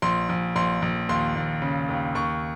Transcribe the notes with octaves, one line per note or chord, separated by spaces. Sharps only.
A#1 C6
A#1
A#1 C6
A#1
D#2 C6
D#2
C#3
D#2
D#2 C#6